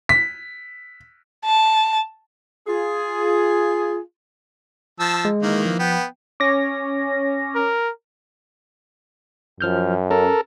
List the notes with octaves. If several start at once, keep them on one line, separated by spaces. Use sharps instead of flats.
B6
A5
F4 G#4
F3 A5 E6
G#3
D#3 E3 A#3
F3
B3 G5
C#4 D6 A#6
A#4
F#2 F3 F6 G6
C#4 A4 A#4